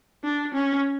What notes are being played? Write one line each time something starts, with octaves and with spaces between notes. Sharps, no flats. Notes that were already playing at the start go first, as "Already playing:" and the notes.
D4
C#4